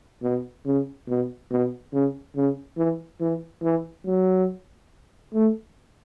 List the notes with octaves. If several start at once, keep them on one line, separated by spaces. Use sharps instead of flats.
B2
C#3
B2
B2
C#3
C#3
E3
E3
E3
F#3
A3